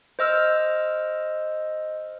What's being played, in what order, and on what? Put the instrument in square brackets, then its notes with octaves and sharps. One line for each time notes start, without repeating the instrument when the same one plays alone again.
[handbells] C5 D#5 E6 F6